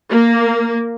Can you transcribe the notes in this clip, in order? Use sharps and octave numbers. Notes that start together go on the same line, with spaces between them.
A#3